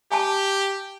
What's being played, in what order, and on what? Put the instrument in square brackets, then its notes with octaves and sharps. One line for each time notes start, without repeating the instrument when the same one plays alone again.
[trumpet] G4 [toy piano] G#5 A5